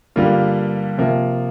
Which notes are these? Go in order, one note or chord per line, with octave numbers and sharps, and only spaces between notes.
G2 D3 G3 A#3 F4
C3 F3 A#3